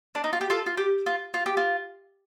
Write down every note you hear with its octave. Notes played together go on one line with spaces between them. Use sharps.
D4
D#4
F4
G4
F4 A4
F4
G4
F4
F4
G4
F4